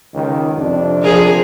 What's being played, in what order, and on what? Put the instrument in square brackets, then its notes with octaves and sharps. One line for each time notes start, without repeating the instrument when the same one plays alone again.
[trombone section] C#2 D#3
F2 C3 D4
[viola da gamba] F3 G#4 A#4